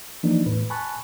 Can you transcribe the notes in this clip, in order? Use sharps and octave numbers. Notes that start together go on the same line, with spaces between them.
E3 F3 A#3 D4 D#4
E2 A2 B4
G#5 A5 B5 C#6 F#6